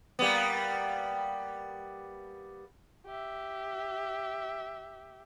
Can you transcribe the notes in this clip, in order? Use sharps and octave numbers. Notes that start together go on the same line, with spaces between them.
G3 A#3 B3
G4 E5